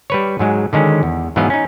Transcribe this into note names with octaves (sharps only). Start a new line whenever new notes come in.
G3 B4 C#5
G#2 F#3 G#3
D3 D#3 G#3 C#4
E2
G#2 E3 F#3 B3 D#5 F5
C#4 D#4